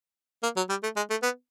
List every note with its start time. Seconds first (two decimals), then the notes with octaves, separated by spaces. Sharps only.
0.43 A#3
0.57 F#3
0.69 G3
0.83 A3
0.96 G#3
1.10 A3
1.23 B3